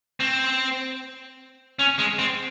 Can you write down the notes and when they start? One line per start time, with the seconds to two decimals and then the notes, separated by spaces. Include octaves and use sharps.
0.20 C4
1.79 C#4
1.99 G#3
2.19 C4